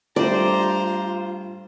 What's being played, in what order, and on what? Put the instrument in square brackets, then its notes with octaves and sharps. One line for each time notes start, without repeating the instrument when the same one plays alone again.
[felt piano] G3 A3 D4 [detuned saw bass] F4 [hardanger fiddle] C5 A#5 [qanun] D5